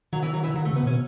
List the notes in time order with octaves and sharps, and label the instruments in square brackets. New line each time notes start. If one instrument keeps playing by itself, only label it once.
[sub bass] D#3 [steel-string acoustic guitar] F#3
[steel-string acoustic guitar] E3
F#3
E3
[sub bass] D#3 [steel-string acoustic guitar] F#3
[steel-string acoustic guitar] A3
[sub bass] C#3
[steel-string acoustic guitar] B3
[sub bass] B2 [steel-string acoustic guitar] C#4